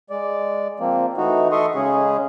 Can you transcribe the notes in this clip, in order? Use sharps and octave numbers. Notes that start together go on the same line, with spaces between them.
G#3 D5
F3 A#3 C4
E3 A3 D#4 F#4
A4 D#5 E5 C6 C#6 D#6
C#3 G#3 C#4 G#4